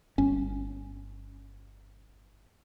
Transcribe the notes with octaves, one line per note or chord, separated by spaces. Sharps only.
G1 C#4